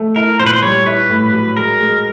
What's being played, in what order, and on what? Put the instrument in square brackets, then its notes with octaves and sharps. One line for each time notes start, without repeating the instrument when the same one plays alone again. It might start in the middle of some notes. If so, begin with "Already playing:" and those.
Already playing: [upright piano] A3
[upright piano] E4 [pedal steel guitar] A#4
[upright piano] A#2 [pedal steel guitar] C5
[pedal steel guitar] B4
C5
[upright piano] G3 [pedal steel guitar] C#5
[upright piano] E4 [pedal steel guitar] B4
[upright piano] A2
F#3
[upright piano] G#3 [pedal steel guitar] A#4
[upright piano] G#3